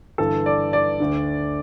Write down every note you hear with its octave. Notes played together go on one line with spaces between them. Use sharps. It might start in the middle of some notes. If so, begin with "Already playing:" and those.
G1 G2 E3 A4
D5
D5
D2 D3